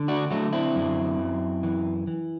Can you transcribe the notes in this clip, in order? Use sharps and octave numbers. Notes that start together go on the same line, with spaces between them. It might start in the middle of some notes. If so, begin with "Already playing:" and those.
Already playing: D3
D4 F#4
D3 F#3 A3
C4 E4
F#2
F#2
E3
E3